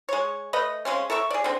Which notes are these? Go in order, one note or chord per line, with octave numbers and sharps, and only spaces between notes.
G#3 C#5
A3 B4 D#5
C#3 G#3 C4 C#4
A4 A#4 E5 C#6
G#4 D5
D3 C4